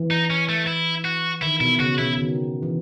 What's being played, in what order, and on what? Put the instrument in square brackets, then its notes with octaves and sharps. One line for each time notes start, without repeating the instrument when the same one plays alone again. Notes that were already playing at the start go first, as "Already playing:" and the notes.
Already playing: [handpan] E3
[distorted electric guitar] D#4
C#4
A3
E4
F#4
[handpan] D#3 [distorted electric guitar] E4
[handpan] B2 [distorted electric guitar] E4
[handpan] C#3 [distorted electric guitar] F#4
[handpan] B2 [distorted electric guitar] E4
[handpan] D#3
E3